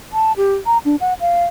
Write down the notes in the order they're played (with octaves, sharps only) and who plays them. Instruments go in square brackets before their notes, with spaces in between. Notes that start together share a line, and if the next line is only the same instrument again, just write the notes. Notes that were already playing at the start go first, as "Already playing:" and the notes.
[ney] A5
G4
A#5
D4
F#5
F5